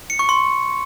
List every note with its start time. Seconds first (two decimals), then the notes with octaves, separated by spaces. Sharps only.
0.10 C#7
0.19 C#6
0.29 C6